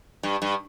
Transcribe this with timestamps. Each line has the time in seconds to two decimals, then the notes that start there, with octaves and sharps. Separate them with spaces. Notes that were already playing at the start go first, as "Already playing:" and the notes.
0.23 G2
0.42 G2